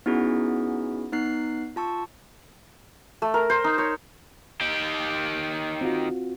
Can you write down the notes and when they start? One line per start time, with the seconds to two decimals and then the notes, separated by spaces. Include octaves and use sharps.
0.06 B3 C#4 D#4 E4 F#4 G#4
1.12 B3 D#4 F#6 C7
1.76 F4 A5 C#6 E6
3.22 A3
3.34 A#4
3.50 C5
3.64 D#4
3.78 C#5
4.61 D#3 G4
5.81 C4 F4 F#4